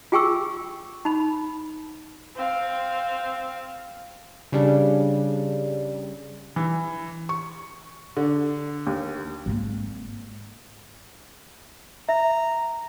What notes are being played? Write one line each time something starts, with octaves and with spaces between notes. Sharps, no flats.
F4 G#4 G5 G#5 C#6 E6
D#4 B5
C4 F5
C#3 G3 D4
E3
C#6
D3
D#2
G#1 A#3
E5 A#5